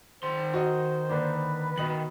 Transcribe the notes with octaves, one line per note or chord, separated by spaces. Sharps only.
D#3 C5 C6
F#4 D#5
D3 A#3 D4 B4
B2 D#3 D#5 F#7